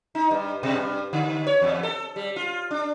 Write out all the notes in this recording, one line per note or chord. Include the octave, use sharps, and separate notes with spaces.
D#4
G2
B2
G2
D3
C#5
E2
A4
G3
F4
D4